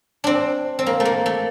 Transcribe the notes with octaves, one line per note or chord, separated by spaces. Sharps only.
C4 D4
C4
A#3
A3
A#3
A3